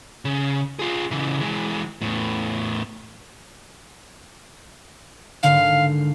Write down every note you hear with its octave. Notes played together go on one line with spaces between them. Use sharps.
C#3
F4 G#4
C#3 E3
E3 G#3
E2 A2
G#1 D3 D4 F5